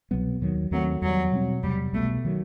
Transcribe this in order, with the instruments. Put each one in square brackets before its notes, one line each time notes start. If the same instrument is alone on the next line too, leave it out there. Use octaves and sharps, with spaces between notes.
[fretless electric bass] C2 B2 F#3 B3
D#2 D#3 F#3
[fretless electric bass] D#2 D#3 A3 C4 [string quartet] F#3
[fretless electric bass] E2 D#3 G3 [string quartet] F#3
[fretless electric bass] B2 G3 C4
[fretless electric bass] E2 C3 F#3 [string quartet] G3
[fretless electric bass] C2 B2 G3 B3 [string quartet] A3
[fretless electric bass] D#3 F#3